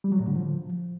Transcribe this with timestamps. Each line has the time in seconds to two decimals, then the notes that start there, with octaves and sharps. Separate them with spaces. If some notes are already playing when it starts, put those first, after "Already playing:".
0.04 G3
0.12 F#3
0.20 A2
0.28 D3
0.35 F3